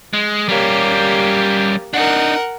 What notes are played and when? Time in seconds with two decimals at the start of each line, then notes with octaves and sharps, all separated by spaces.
0.13 G#3
0.49 G3 A#3 C#4 G4
1.94 D4 D#4 A#4 F#5